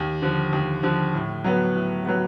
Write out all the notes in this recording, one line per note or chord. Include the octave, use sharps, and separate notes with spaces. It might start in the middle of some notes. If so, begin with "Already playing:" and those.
Already playing: D#2
D3 F3
D#2
D3 F3
A2
F#3 B3
A2
F#3 B3